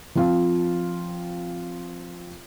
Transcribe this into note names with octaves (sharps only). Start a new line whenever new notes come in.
F3 C4 F4